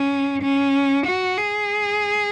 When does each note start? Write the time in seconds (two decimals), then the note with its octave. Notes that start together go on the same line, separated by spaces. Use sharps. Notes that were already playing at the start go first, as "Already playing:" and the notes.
Already playing: C#4
0.42 C#4
1.06 F#4
1.38 G#4